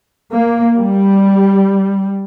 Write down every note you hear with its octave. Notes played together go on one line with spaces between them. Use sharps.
A#3
G3